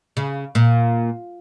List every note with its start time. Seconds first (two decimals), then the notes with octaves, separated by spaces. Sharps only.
0.17 C#3
0.55 A#2